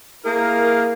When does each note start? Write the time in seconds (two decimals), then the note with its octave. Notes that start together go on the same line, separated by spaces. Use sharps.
0.25 A#3 E4 G#4 A#4